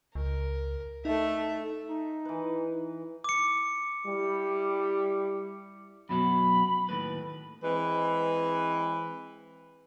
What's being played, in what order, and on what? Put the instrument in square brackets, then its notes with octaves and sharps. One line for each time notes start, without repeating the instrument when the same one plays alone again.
[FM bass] C#2 [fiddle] A#4
[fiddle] A3 E5 [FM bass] D#4
[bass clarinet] D#4
[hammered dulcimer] E3 B4
[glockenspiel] D6 C#7
[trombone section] G3 E4
[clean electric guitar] F#2 B2 F#3 [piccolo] B5
[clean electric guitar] D#2 A2 B4
[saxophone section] E3 G#3 C4 B4